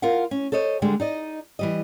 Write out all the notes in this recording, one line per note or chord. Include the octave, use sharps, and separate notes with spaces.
F4 A#4 F5 F#5
C#4
A4 C5 C#5 D#5
D3 G3 G#3
D#4 D5 D#5
E3 G3 D#5